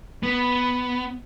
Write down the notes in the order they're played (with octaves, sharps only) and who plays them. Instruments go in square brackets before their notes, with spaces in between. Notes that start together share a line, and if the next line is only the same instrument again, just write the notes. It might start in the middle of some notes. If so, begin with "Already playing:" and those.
[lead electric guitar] B3